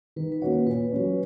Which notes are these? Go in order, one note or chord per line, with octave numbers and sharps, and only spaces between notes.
D#3 B4
B4
A#3 C#4 F#4 C#5
A#2 B4
F#3 C#4